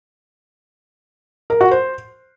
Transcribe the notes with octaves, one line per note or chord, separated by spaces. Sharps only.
A#4
F#4
C5